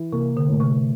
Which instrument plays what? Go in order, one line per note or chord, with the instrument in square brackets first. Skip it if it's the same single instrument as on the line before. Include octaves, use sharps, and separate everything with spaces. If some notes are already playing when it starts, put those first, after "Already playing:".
Already playing: [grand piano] E3
[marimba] C3 [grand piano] A#3
[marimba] D3
[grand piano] A2
[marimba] C3